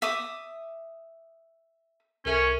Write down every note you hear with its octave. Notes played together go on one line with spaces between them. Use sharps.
E5 D6 D#6
C2 C#4 A4 A#4 E5